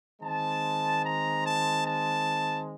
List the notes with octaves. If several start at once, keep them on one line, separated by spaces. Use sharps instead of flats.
D#3 G#3 C4 A5
A#5
A5
A5